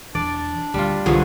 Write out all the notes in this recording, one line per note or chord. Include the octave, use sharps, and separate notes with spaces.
E1 E3 D4 D5
D2 G3 F4
C2 G2 D3 F3 F#3 G#4 A4